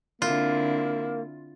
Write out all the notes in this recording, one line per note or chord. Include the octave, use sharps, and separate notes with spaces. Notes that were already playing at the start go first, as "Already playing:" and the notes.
D3 A#3 C4 E4 F4